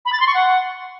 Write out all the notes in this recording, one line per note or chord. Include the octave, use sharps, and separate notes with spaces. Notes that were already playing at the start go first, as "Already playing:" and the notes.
B5
A6
C6
C#6
F#5